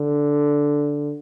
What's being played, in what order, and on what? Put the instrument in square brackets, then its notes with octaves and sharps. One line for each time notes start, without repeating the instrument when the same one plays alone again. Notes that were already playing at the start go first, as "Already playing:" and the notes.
Already playing: [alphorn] D3